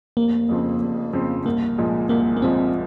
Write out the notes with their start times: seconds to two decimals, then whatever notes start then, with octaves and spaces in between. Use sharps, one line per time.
0.17 F1 A#3
0.49 F2 C#3 F3 C4
0.81 F1
1.13 F2 C#3 F3 C4
1.45 C2 A#3
1.78 A#2 F3 G#3
2.09 C2 A#3
2.37 A#3
2.42 A#2 F3 G#3 C4